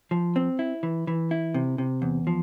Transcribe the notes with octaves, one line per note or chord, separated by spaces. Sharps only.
F3
C4
E4
E3
E3
E4
C3
C3
E2
F3